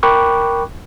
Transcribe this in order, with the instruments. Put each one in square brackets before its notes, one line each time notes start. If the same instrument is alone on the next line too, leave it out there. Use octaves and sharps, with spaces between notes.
[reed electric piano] A#4 G5 B5 C#6 D6 F#6